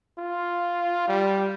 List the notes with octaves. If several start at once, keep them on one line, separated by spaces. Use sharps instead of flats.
F4
G3